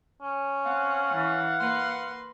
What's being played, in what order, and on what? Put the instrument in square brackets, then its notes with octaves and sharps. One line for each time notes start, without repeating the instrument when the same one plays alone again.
[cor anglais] C#4
[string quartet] C4 [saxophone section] F5 F#5
[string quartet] E3
A#3 B4 C6